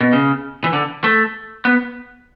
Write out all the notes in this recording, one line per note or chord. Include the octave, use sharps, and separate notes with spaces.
B2
C#3
E3
D3
A3
B3